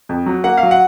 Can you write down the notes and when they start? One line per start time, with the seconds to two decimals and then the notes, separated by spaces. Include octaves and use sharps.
0.09 F2
0.26 F#3
0.44 A#3 F#5
0.57 F5
0.63 F#3
0.71 F#5